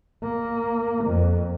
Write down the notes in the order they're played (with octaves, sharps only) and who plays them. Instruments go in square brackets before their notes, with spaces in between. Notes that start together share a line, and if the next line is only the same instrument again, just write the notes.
[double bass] A#3
F2